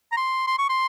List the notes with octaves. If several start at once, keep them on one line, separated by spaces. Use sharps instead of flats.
A#5
C6
C6
C#6
C6